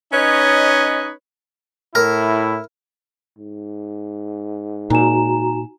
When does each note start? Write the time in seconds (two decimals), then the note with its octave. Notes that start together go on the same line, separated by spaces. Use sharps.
0.12 C#4 D#4 B4 C#5 D#5
1.95 A2 E4 A#4
3.39 G#2
4.90 A#2 D#4 F#4 G#5 A#5 E7